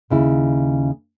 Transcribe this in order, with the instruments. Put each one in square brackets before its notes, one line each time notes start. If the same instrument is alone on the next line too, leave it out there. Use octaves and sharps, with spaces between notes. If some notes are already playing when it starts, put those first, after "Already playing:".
[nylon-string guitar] D#2 C#3 E4